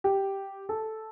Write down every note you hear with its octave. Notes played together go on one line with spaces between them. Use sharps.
G4
A4